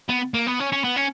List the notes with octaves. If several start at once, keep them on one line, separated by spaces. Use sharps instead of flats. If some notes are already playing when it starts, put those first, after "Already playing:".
B3
A#3
B3
C#4
C#4
B3
C#4